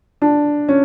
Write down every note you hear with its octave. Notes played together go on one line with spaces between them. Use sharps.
D4
C#4